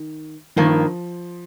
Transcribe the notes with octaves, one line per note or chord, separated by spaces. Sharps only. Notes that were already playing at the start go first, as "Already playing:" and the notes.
Already playing: D#3
G2 D#3 F3 A#3